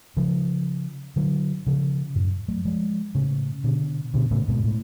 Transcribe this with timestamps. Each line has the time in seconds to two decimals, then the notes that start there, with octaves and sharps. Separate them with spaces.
0.17 C#3 F3
1.16 D3 F#3
1.67 C#3 F3
2.15 F#2 A2
2.48 F#3 A3
2.65 F3 G#3
3.15 A2 C#3
3.64 B2 D3
4.14 B2 D3
4.31 A2 C#3
4.48 G#2 B2
4.64 A2